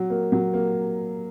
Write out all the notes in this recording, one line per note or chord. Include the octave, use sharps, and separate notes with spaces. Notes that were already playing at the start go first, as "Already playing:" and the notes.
Already playing: F#3
A#3
F#3
A#3